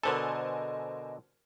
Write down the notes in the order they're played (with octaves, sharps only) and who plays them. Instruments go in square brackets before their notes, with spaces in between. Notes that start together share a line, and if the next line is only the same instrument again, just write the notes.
[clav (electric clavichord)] B2 D3 A4 [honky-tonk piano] A#4 C5 G#5 [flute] D#5